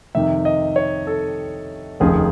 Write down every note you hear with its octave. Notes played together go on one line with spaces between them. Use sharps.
F2 C3 D#3 E5
D#5
C#5
A4
F1 D#2 C#3 F3 G#4